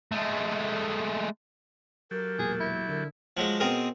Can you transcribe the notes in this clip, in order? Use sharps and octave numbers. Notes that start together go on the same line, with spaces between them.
G#3 A3
F#3 G4 A4 A#4
E1 A#2 G#4
E4
D3 A#4
F3 F#3 G#3
B2 C4 G#4 A#4